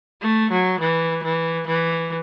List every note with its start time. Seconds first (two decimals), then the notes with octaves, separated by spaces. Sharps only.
0.22 A3
0.52 F#3
0.80 E3
1.24 E3
1.67 E3